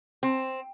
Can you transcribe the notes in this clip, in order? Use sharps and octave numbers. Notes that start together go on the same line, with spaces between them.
C4